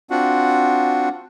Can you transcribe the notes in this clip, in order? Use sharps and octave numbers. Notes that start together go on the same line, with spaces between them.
C4 D4 F4 F#4 F#5